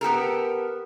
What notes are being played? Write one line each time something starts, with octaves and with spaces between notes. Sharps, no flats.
B3 G4 A4 A#4